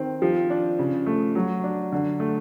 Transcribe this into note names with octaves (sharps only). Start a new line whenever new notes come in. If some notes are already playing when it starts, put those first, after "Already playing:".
Already playing: D#3 C4
F3
D4
C#3
A3
F#3
D4
D3
A3